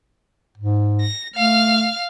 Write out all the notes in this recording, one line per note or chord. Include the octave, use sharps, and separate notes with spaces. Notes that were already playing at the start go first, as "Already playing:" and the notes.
G#2
A#6
A3 F5 F6